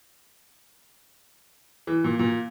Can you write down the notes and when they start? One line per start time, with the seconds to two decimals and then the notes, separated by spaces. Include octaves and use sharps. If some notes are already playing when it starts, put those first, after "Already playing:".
1.87 E3
2.04 A#2
2.19 A#2